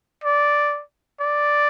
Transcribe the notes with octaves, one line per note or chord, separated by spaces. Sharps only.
D5
D5